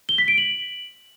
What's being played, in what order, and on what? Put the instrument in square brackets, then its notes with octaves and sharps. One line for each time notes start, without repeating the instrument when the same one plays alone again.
[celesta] G7
B6
D7
F#7